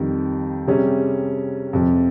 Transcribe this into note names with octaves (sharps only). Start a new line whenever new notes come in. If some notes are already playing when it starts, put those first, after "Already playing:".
Already playing: F2 D#3 G3
C3 G3 C#4 G#4
F2 C3 F3